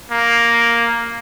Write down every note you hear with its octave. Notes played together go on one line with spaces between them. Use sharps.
A#3